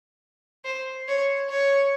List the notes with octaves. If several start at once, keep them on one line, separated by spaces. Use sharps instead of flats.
C5
C#5
C#5